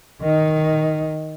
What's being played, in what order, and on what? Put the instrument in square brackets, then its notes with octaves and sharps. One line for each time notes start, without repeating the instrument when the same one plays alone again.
[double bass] D#3 D#4